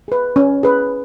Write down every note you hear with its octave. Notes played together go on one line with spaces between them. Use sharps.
G#4 B4
C#4
G#4 B4